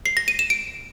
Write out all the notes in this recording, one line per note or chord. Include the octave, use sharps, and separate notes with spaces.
C7
A#6
D#7
E7
D7